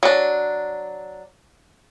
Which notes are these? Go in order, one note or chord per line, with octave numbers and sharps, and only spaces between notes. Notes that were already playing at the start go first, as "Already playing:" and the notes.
F#3 D4